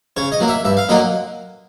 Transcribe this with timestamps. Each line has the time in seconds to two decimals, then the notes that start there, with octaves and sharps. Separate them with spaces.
0.17 C#3 C#5
0.32 D#5
0.40 F#3 A#3
0.48 E5
0.64 G2 E5
0.77 F5
0.89 D3 F#3 A#3 D#5